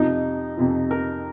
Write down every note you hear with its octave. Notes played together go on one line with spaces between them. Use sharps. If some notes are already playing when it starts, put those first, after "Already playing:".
Already playing: F2 C3 F3 D#4
F2 C3 F3
A#4